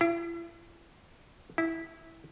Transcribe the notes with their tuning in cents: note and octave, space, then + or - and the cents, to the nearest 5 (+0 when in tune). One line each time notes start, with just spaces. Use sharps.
E4 +40
E4 -10